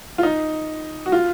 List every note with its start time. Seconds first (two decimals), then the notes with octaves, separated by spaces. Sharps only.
0.18 F4
0.23 D#4
1.06 F#4
1.12 F4